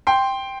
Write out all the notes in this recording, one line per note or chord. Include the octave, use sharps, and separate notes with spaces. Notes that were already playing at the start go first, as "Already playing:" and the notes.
G5 C6